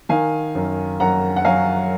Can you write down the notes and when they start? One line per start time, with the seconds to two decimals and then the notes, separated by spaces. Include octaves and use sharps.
0.09 D#3 F5 G#5
0.55 F#2
1.00 F#2 F#5 A#5
1.36 F#5
1.45 F#3 F5 G#5